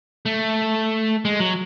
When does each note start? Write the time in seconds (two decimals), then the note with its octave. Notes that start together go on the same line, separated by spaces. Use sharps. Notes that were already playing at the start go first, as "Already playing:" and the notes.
0.26 A3
1.25 G#3
1.40 F#3